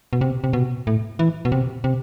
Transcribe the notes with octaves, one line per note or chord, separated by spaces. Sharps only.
B2
C3
C3
B2
A2
E3
B2
C3
C3